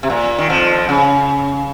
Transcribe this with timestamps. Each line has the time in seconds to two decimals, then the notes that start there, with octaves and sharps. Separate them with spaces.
0.03 C3
0.10 A#2
0.38 D#3
0.49 F2 F3
0.89 C#3